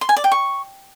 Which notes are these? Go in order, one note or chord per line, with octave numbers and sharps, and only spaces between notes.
C6
G#5
D5
G5
C#6